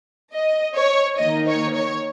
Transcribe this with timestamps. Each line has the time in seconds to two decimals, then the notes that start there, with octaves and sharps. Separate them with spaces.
0.34 D#5
0.77 C#5
1.19 D#3 A#3 D#4 D#5
1.48 C#5
1.75 C#5